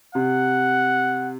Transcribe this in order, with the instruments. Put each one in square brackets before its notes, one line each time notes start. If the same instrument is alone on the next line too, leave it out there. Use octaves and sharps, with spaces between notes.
[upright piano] C3 [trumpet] F#5